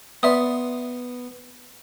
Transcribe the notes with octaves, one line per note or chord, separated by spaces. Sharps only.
B3 D5 E5 C6 D#6